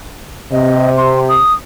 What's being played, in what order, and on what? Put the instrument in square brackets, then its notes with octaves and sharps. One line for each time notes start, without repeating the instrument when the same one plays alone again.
[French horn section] C3 [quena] D#5
[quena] C6
D#6